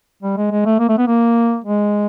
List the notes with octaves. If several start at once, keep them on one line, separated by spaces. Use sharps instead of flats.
G3
G#3
G#3
A3
A#3
A3
B3
A#3
G#3